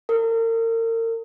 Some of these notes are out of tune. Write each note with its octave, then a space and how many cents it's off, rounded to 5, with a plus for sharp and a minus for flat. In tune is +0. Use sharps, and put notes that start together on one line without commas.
A#4 -40